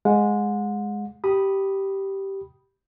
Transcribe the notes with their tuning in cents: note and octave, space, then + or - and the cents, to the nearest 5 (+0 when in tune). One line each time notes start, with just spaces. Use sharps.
G#3 +0 F#5 -35
G4 -10 B5 -5 D#6 +0